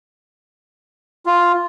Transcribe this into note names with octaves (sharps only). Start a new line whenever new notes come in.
F4